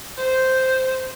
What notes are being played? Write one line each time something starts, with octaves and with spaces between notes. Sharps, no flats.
C5